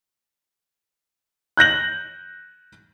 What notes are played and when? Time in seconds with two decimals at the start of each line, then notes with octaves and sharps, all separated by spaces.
1.57 F#6 G6 A#6 F#7